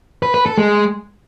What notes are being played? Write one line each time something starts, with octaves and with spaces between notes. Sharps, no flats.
B4
B4
A4
G#3